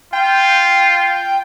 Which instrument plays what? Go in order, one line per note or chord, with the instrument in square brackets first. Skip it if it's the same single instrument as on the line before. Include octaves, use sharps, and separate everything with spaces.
[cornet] F4 [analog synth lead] G5